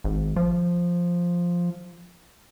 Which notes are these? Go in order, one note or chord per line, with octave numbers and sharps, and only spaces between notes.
G#1
F3